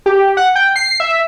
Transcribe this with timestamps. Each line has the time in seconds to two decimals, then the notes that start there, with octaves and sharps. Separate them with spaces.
0.06 G4
0.37 F#5
0.56 G5
0.76 C7
1.00 E5